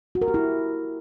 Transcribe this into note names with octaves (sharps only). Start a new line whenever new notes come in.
F#4
A#4
G4
E4